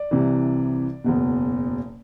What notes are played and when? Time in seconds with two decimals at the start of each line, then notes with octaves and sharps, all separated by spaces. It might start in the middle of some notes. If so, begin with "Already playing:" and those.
Already playing: D5
0.11 C2 C3 E3
1.04 F#1 E2 B2